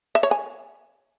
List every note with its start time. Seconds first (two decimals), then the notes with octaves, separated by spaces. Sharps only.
0.15 E5
0.23 C#5
0.31 G#5